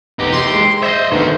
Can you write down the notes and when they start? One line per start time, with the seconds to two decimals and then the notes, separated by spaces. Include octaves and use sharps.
0.19 F1 B3 D#4 G4
0.32 E3 C6
0.52 G#3
0.83 C5 D#5 E5
1.11 D2 D#3 A3 B3 D#4 C5